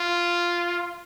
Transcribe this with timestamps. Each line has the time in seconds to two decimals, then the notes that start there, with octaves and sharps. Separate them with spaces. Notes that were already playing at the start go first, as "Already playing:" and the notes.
Already playing: F4